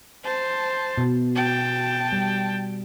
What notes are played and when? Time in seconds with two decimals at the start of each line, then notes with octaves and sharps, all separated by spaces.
0.24 C5 A5
0.98 B2
1.35 G5 A5
2.12 G3